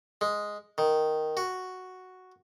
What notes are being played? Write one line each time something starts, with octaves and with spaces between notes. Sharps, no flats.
G#3
D#3
F#4